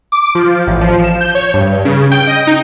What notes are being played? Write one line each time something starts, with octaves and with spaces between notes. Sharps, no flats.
D6
F3
A1
F3
E7
G6
C#5
G2
C#3
G5
D#5
D#4